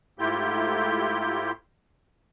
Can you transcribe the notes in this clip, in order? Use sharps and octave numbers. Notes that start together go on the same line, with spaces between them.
G#2 A3 E4 F4 G4 G6